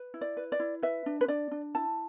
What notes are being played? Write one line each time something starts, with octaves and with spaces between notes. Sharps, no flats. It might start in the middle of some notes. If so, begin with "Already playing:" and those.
Already playing: B4
E4
D5
B4
D5
E4
B4 E5
D4
B4
D4 D5
D4
E4 A5